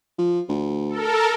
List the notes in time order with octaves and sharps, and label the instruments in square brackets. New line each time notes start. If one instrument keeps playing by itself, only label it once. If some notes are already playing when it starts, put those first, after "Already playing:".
[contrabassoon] F3
D2
[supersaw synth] A4 A#4